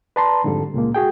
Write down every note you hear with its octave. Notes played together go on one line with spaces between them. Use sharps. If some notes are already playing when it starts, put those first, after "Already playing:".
B4 D5 A5 A#5 C6
F2 G#2 D3 G3 A4
C#2 A#2 G#3 A#3
F#4 G#4 G5